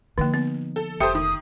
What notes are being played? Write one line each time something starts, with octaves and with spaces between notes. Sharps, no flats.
D3 F3 A#3 D#4
B3
A4
F1 G4 A4 C5 E5 D#6
D#3 D#6